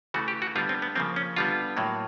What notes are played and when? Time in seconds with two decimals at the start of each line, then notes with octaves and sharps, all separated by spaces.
0.14 C#3 E3 A3 F#4
0.28 G4
0.42 F#4
0.55 D3 G3 B3 F4
0.69 C4
0.82 B3
0.96 C#3 F3 A#3 C4
1.16 C#4
1.36 D3 G3 B3 F4
1.77 A2 F#3 A#3